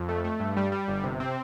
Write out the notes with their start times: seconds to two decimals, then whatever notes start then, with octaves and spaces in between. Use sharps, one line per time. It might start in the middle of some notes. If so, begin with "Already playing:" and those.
Already playing: F2
0.09 A3
0.24 A3
0.40 G2
0.57 G3
0.72 G3
0.88 G1
1.04 C3
1.20 C4